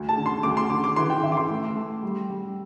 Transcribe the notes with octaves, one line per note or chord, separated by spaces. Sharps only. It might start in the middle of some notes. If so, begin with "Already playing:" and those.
Already playing: D2
A5
D3
C6
D2 D6
C6
D3 D6
D6
E3 C6
G5
E3 E5
D6
C6
A3
A3
G3
G3